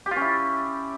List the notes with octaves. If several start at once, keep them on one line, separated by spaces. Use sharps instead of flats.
G4
F4
C#4
E4